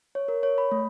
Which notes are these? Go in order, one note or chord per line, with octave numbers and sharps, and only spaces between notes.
C#5
A#4
C#5
B5
A3